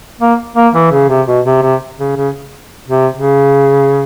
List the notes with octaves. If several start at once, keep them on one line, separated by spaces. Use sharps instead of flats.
A#3
A#3
E3
C#3
C3
B2
C3
C3
C#3
C#3
C3
C#3